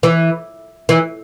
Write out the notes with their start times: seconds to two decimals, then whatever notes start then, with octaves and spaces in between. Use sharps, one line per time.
0.03 E3
0.89 E3